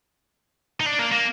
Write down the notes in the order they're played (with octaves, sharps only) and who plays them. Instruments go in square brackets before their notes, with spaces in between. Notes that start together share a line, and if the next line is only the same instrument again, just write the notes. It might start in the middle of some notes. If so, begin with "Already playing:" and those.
[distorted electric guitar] D#4
D4
A#3
A#3